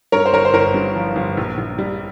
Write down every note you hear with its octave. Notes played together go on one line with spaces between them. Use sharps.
G2 A#4 C#5
C5
G1 A#4 C#5
C5
G1 A#4 C#5
G2
F3
G1
A#1
A#1
G3